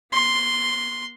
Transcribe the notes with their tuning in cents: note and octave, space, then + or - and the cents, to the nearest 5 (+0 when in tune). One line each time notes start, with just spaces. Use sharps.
B3 -45 C6 +0